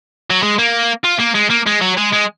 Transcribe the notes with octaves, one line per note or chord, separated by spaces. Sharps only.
F#3
G#3
A#3
F4
A#3
G#3
A#3
G#3
F#3
G#3
G#3